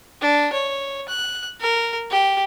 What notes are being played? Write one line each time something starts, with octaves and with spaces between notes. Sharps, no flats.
D4
C#5
F#6
A#4
G4